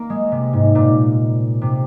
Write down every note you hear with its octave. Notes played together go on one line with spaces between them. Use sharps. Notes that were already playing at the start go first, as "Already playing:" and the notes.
Already playing: A#3
G#3
C3
G#2
A#2
C3